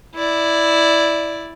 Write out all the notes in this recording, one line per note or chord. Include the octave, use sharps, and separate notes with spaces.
E4 D5